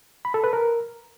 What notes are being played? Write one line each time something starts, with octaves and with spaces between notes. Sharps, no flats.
B5
A4
B4
A#4